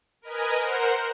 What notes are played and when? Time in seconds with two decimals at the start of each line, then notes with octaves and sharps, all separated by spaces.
0.22 A#4 B4 D#5 G#5
0.58 A#4 C5 F#5